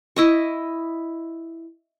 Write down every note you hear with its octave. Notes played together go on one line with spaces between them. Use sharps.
E4 D#5 C#6